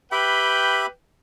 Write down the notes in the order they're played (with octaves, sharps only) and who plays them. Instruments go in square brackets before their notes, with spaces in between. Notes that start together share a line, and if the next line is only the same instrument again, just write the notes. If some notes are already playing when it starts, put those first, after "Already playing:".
[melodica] G4 E5 B5 [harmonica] B4 G5